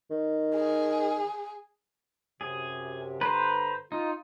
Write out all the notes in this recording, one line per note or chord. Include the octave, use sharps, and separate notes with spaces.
D#3
G#4
F#2 C3 G#4
G2 D3 B4 C5 A#5
D#4 F4